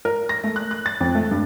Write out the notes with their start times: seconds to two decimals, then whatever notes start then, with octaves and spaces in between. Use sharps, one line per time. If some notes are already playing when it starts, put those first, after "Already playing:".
0.05 A#4
0.29 A#6
0.44 A3
0.56 F#6
0.71 F#6
0.86 A6
1.00 F2
1.15 A3
1.31 G2